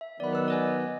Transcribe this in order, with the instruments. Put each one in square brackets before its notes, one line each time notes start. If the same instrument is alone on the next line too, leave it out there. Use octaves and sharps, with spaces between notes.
[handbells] E5
[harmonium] D#3 F#3 B3 [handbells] D5 B5
[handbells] B4 E6
D5 D#5 G#5